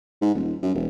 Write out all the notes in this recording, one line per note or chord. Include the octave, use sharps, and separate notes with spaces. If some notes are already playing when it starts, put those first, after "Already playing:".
G#2
D#1
F#2
E1